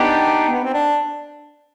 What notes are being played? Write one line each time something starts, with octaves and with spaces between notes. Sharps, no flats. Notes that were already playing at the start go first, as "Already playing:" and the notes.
Already playing: B3 D4 D#4 G4
B3
C4
D4